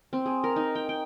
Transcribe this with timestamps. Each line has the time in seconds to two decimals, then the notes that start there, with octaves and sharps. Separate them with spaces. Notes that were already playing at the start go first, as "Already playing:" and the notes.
0.13 C4
0.26 G#4
0.44 A#4
0.56 D#4
0.75 G5
0.89 G5